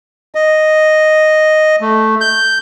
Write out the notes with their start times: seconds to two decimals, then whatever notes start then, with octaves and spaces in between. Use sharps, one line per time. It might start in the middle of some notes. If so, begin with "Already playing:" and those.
0.35 D#5
1.81 A3
2.21 G6